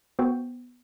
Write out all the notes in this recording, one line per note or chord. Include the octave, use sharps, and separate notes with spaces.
B3 F#4 C5 G5